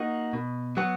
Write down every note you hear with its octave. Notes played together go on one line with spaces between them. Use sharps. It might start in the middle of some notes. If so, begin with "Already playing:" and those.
Already playing: A#3 D#4 F#4
B2
F#3 B3 F#4